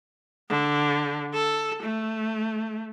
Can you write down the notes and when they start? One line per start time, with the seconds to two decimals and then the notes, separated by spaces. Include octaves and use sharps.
0.49 D3
1.34 A4
1.83 A3